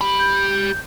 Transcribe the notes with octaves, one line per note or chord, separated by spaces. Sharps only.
G4 B5
G6